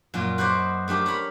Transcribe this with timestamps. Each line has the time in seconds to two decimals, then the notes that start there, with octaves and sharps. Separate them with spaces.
0.14 F#2 A#2 F4
0.38 F#4 B4 C5 D5 D#5
0.88 A3 D4 G4 A#4
1.06 A#4 C#5 B5